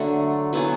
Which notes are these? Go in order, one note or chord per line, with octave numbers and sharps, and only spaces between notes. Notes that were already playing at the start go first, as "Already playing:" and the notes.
Already playing: D3 F#3 A3
F#3 B3 E4 G#4